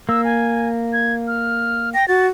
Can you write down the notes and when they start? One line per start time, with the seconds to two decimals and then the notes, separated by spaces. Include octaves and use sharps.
0.09 A#3 E6
0.24 G#5
0.93 G#6
1.28 F6
1.94 G5 A#6
2.08 F#4 A6